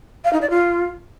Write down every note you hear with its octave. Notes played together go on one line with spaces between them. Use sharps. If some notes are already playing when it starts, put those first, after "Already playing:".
F5
D#4
D5
F4